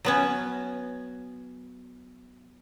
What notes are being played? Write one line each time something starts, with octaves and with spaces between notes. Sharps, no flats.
F#3 B3 C#4